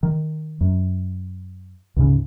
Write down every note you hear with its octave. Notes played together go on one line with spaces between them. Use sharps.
D#3
F#2
C#2 G#2 C#3